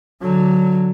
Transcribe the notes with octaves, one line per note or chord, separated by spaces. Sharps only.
D3 F#3